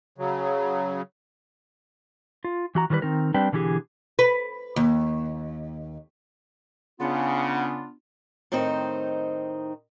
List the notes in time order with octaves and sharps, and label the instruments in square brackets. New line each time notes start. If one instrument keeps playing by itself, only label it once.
[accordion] C#3 F#3
[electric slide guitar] F4
E3 F#4 A#5
D#3 E3 G3 A#4 B4
D#3 C4 D#4 A#4
G3 C4 D4 B4 G5
B2 D3 E3 F#3 G4 G#4
[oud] B4
D#2
[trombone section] C#3 [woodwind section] B3 D4 F4 [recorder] F#5
[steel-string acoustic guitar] A2 D#3 C4 D#4 C5